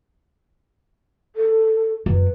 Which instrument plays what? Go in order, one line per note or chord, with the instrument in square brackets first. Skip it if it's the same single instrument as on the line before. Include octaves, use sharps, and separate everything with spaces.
[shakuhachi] A4
[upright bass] F#2 [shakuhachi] B4